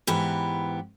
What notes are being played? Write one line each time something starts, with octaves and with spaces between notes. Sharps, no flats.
G#2 E3 B3 G4